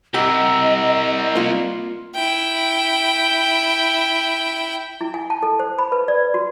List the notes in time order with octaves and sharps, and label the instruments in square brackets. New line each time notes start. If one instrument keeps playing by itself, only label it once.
[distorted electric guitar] C2 [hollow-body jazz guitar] G4 [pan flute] D#5 [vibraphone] F#5 A#5 E6
[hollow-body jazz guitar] A#3 F4
[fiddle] E4 G5
[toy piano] E4
G#5
A5
A4
C5
B5
B4
D5
F#4